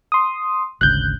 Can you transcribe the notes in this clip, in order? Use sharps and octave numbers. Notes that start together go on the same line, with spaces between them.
C6 D#6
G#1 D2 C#3 F#6 G6